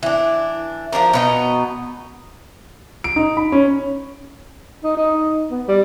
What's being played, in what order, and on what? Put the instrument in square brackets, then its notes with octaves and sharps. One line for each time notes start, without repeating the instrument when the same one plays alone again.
[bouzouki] E3 D4
F3 A3 D4 A#4
B2 B3 D#4
[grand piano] D7
D#4
B5
C#4
[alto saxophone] D#4
D#4
B3
G3